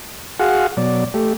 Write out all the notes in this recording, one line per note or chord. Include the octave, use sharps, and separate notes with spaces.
F#4 G#4 F5 F#5
B2 F#3 D5
A3 G4